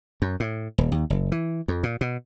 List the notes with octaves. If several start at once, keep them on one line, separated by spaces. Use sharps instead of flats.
F#2
A2
D#1
D#2
F#1
E3
F2
A#2
B2